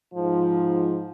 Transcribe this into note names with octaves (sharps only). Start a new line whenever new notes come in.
G#2 F3